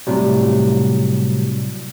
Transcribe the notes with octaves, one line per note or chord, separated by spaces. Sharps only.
A2 C3 F#3 G3